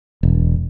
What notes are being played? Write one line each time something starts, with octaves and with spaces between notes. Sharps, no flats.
E1